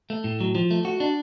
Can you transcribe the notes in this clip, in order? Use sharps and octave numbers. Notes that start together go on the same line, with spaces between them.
A3
A2
F#3
F3
A3
F#4
D4